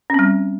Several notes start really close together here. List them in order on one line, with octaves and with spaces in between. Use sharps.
C#4 C4 G3